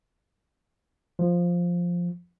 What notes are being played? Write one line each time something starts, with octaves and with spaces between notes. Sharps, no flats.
F3